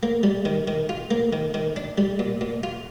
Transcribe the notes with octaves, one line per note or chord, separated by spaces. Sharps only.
A#3
G3
D#3
D#3
F4
A#3
D#3
D#3
D4
G3
A#2
A#2
F4